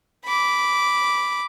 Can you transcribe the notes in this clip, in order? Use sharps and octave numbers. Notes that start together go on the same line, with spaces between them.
B5 D6